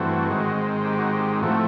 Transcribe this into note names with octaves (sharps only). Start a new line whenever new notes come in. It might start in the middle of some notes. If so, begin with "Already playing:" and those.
Already playing: G2 E3 A3 C4 F#4
G#2 D#3 G#3 C4
G4
F#4
G4
A2 F3 A3 C4 F#4